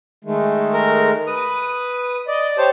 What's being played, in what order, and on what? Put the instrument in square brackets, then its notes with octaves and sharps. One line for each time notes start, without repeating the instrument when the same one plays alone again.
[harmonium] D#3 G#3 A3
[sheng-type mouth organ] A#4
[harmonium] B4 [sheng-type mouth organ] D#6
[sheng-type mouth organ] D5 [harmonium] D#5
[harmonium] G4 C#5 [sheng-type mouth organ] C5 A5